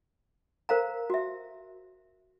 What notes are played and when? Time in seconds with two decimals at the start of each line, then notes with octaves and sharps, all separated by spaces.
0.69 A#4 C5 F5 A#5
1.10 F#4 E5